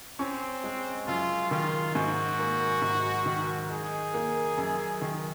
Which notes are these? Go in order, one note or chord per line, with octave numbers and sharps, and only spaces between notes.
C4 C#4
G#3
F#2 F4
D#3 F4
G#2 F#4
A#3
G#2
D#3
D#4 G#4
A#3
F#2
D#3